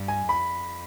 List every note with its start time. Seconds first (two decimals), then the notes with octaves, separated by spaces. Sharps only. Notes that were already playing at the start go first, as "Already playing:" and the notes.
Already playing: G2
0.08 G#5
0.29 F2 B5